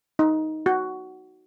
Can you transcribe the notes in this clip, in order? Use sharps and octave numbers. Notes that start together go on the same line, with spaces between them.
D#4
F#4